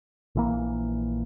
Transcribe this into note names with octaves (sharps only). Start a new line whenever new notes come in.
A#1 E3 A#3